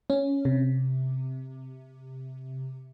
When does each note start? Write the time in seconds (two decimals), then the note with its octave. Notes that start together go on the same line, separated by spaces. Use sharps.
0.10 C#4
0.45 C3